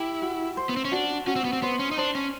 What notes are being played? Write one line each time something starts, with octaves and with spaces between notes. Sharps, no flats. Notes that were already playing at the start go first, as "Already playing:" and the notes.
Already playing: E4 G4
F#4
C5
B3
C4
C#4
D4 F#4
C#4 F#4
C4
B3
C4
B3 C5
C#4
D#4
D4 C5
C#4